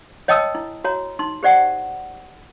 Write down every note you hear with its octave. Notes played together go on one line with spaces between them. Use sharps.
C#5 D#5 G5 A5 D#6 E6
E4
F#4 C#5 A#5
D#4 C6
G4 C5 D5 F#5